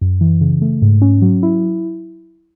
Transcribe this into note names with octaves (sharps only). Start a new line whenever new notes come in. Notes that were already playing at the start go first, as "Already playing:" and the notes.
F#2
E3
C#3
A3
G#2
C#4
F#3
E4